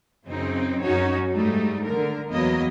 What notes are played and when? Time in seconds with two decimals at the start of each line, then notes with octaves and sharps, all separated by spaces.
0.25 F#2 C#3 C4 D#4
0.82 F#2 C#4 D#4 F#4 C#5
1.33 G#2 G3 A3 D#4
1.83 D3 A#4
2.30 E2 F#3 A#3 B3 D#5